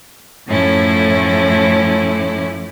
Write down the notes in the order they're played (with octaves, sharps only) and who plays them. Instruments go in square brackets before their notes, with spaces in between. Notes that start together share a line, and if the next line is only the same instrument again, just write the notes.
[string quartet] F#2 A2 F3 A3 C#4 E4